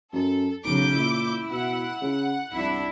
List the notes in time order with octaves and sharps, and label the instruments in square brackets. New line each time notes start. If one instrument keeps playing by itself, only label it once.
[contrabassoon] F#2 [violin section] A4
[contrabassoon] B1 [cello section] C#3 F#3 [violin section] D6 G6
[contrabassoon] A#2 [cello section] E4
[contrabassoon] B2 [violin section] F#5
[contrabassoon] C#3
[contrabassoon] C2 [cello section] D4 E4